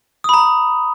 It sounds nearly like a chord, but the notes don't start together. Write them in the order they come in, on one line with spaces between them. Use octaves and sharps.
D#6 B5 A#5